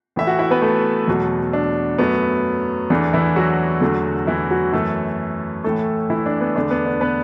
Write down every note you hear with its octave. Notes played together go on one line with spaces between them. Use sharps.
A2 E3 A3 E5
F#4 F#5
E4 E5
B3 B4
A3 A4
E2 B2 F#3 A3
D4
F#2 F#3 A3 B3
E2 E3 A3 D4
E3 E4
F#3 F#4
E2 D3 F#3 A3
E3 E4
F#3 F#4
F#2 E3 A3 A4
A2 E3 A3 A4
E3 E4
D4
B3
E2 D3 A3 D4
B3
D4
B3 B4